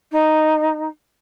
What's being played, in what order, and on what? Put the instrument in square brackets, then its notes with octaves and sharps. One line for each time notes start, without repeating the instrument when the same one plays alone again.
[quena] D#4